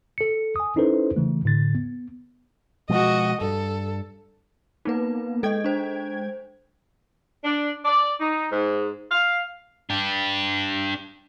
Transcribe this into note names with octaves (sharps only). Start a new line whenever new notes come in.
A4 C#7
G#5 D#6
C#4 D#4 E4 A4 B4 C5
C#3 E3 A3
A2 D3 A6
B3
B2 F3 G#3 F#4 D#5
G2 A4
A#3 B3 D#4 B4
G#3 A4 D#5 G5 G#6
D4 C5
D4
D5
D#4
G#2
F5
D4 G4